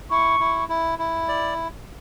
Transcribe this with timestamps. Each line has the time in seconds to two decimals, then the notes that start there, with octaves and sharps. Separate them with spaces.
0.10 E4 C#6
0.40 E4
0.69 E4
0.99 E4
1.28 D5